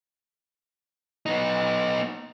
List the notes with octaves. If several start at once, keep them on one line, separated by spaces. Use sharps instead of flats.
B3 D#4